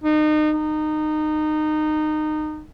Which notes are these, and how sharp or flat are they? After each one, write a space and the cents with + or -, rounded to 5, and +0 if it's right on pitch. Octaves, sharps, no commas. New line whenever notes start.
D#4 -30
D#4 -20